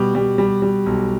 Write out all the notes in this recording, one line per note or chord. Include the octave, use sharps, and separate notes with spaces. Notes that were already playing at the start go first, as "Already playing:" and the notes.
Already playing: B2 G3
G3
G3
G3
B1